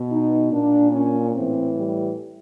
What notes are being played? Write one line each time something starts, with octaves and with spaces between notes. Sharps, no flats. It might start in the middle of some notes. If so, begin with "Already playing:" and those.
Already playing: B2
D#4
A#2 D4
C#4
A2 E3 C4
G3